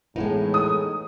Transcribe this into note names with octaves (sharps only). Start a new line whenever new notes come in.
A2 E3 G#3 B3 D#4
D#6